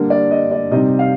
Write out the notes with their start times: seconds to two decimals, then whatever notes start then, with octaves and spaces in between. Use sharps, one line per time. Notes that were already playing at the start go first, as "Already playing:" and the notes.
Already playing: D3 G3 A#3
0.10 D5
0.31 D#5
0.52 D5
0.71 C3 G3 C4 D#4 D#5
0.99 F5